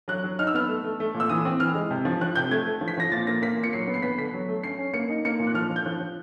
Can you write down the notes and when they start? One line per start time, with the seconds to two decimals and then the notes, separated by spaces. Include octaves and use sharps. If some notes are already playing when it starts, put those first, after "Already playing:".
0.08 F#3 F#6
0.24 F#3
0.39 D#4 F6
0.47 E6
0.54 B3 F6
0.68 A3
0.84 A3
1.00 A3
1.14 A#2
1.20 E6
1.29 E3 D#6
1.45 C4
1.60 E3 F6
1.75 G#3
1.90 C3
2.05 F3
2.21 F3 F#6
2.35 C3 G6
2.51 A3 G#6
2.66 A3
2.81 F3
2.88 B6
2.97 F3 A#6
3.11 A#2 A6
3.27 A#3 A#6
3.42 A#3 B6
3.57 A#2
3.63 C#7
3.73 F#3 C7
3.87 B3
3.94 C7
4.03 B3 B6
4.18 D3 B6
4.34 F#3
4.49 A3
4.63 C#4 C7
4.78 C#4
4.94 A#3 C#7
5.10 D#4
5.25 A#3 C#7
5.40 A#2
5.47 F#6
5.54 F3 F6
5.70 F3
5.76 G6
5.85 F3 F#6
6.00 F3